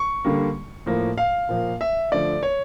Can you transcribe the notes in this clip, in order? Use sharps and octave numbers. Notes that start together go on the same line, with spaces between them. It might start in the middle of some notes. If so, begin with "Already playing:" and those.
Already playing: C#6
D3 G3 A#3
A2 F3 A#3
F5
A#2 F3 A#3
E5
D3 F3 A3 D5
C#5